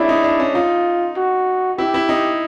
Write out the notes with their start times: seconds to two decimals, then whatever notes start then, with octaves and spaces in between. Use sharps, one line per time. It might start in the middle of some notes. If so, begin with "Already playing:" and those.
Already playing: G#3 C#4 D4 E4
0.09 D#4
0.24 D4
0.39 C#4
0.55 D#4 F4
1.16 F#4
1.78 E4 G4
1.94 E4
2.09 D#4